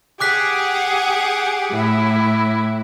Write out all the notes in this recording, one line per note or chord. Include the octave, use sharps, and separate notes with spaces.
G4 G#4 F#5 D6 F#6 B6
A2 E4